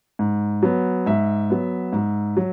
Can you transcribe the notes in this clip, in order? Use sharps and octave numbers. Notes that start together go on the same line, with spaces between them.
G#2
F#3 B3
G#2 E5
F#3 B3
G#2
F#3